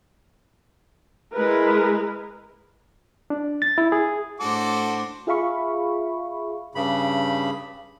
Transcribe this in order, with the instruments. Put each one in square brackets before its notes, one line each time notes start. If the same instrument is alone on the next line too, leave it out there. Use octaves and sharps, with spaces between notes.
[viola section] G#3 E4 G#4 A#4 B4
[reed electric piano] D4
A6
E4
G#4
[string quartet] A2 D4 C5 [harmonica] F#4 A4 D6
[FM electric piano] F4 G#4 E5 F5 B5 C#6
[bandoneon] G2 C#3 B5